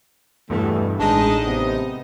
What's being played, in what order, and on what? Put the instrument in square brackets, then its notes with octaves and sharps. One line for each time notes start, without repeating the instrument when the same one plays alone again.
[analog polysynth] E2 G2 B2 [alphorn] E3 [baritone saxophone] A3
[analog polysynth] A1 D#4 D#5 [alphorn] G#3 [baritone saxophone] D4
[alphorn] C3 [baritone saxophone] B3